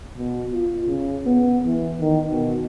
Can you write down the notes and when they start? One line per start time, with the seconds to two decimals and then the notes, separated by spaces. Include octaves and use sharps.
0.17 B2
0.53 F4
0.87 C#3
1.26 B3
1.66 E3
2.01 D#3
2.31 B2